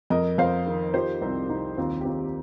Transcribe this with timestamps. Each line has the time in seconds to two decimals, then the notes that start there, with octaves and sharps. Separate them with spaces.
0.10 F2 A#4 D#5
0.38 F2 C5 F5
0.67 D#3
0.94 F3 G4 C5
1.21 C2 C4
1.49 C2 D#4
1.78 D#2 C4 F4
2.01 G4
2.05 D#2 C4 F4